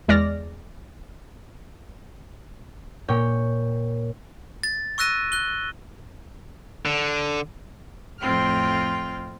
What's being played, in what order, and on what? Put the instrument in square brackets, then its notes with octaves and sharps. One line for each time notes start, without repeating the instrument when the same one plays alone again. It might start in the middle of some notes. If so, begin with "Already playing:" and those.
[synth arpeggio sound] E2 G#3 D5 F6 A#6
[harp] A#2 C#5 G5
[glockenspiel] A6
C#6 E6 F#6 A#6 D#7
F#6 G7
[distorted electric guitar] D3
[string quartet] F2 A2 C4 F4 G5 F6